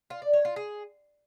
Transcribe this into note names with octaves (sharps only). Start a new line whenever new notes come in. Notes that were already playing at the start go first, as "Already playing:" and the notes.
F4
D5
C#5
F4
G#4